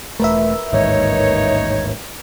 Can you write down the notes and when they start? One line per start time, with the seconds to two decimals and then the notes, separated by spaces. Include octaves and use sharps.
0.20 E1 A3 A#4 B4 E5
0.73 A1 D#2 G#2 D#4 C#5